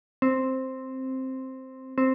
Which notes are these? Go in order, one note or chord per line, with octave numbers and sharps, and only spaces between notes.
C4
C4